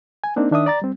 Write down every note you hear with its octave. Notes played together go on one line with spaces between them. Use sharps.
G#5
A#3 C4 D4 D#4
D#3 D4 E5 D#6
D5 A#5 A6
G3 C4